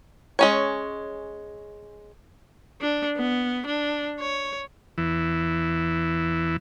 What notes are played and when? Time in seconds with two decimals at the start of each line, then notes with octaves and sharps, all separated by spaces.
0.39 G#3 C#4 C#5
2.81 D4
3.17 B3
3.66 D4
4.20 C#5
4.98 E2 E3